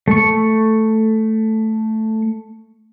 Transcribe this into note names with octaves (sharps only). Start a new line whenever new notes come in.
A3 C#6